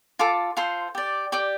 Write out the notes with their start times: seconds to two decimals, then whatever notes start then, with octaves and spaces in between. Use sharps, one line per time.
0.19 F4 A4 D6
0.57 F4 A4 C5 C6
0.95 G4 D5
1.32 G4 D5 D6